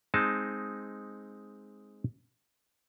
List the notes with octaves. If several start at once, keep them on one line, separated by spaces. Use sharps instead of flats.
G#3 C4 D#4 A5